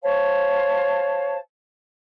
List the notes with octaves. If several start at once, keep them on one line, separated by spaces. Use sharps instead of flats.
C5 C#5 F5 A5